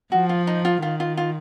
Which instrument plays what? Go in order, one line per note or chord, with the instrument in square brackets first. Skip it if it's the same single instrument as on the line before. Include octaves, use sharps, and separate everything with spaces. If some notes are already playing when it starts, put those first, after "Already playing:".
[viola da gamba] F3 [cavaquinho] F#4
[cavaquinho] F4
D#4
F4
[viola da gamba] D#3 [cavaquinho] F4
[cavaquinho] F4
F4